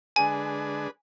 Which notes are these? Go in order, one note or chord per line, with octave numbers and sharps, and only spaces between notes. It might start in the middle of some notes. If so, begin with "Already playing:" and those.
D3 G#3 D4 G#4 B4 G#5